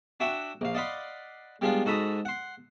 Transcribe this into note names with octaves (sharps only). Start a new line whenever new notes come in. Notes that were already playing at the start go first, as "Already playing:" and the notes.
D4 F#4 E5 F#5 G5
A#1 F5
D5 D#5 F5 F#5 B5 C6
G3 G#3 B3 D4 F4
G#2 F#4 A4 A#5 B5 D#6
F#5 C6